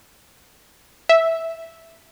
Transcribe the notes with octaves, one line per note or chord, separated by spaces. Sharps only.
E5